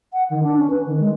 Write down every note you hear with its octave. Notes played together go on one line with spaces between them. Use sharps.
F#5
D#3
D4
C#4
B4
D#3
G#3